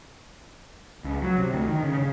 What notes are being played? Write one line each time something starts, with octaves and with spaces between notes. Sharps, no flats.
C#2
F#3
C3
D2
D#3
C#3
C#3